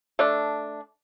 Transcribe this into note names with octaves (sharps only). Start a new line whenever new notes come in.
A3 D4